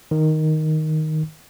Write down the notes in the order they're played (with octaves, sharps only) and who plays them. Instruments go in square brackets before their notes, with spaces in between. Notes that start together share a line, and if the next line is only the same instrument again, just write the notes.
[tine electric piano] D#3